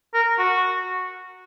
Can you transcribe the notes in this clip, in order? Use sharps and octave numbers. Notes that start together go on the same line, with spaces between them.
A#4
F#4